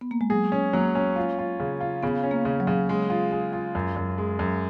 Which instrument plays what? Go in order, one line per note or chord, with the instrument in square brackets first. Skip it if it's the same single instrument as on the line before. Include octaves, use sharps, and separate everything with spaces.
[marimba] B3
A#3
G#3
[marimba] F#3 [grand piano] G#4
[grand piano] C#4
[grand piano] F#3 [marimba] A#3
[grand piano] C#4
F4
F4
C#3
F4
[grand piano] C#3 [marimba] B3
[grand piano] C#4
[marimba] A#3
[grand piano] C#3
[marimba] F#3
[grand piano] C#3
G#3
F4
G#3
F4
F#2
F#2
G#3
F#2